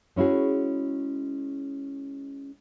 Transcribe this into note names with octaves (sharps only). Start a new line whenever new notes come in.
G#3 C#4 E4 F#4 G#4